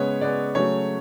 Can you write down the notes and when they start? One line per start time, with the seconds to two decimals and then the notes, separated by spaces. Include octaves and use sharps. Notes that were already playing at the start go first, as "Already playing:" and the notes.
Already playing: C#3 G#3 B3 C#5
0.21 C#3 G#3 B3 D5
0.55 C#3 F#3 A3 C#5